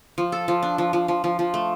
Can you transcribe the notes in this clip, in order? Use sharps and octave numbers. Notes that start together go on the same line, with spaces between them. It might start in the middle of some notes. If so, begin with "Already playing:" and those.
F3
A4
F3
D4
F3
F3
F3
F3
F3
A3